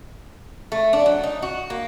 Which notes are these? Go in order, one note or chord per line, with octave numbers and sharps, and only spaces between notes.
A3
D4
F#3
D#4
F#4
A#3